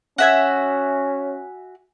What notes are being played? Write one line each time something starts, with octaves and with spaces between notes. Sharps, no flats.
C#4 F#4 E5 G#5